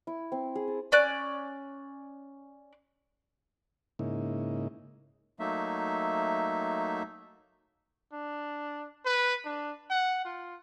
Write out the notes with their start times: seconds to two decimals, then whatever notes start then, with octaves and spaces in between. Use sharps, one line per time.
0.07 E4
0.32 C4
0.55 G#4
0.68 A5
0.92 C#4 D5 F#6
3.99 G#2 C#3 A#3 D#4 E4
5.40 F#3 A3 A#3 D#4 E5
8.13 D4
9.05 B4
9.45 D4
9.90 F#5
10.25 F4